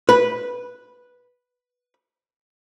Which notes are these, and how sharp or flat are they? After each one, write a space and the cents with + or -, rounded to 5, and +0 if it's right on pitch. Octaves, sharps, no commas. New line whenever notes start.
B4 -5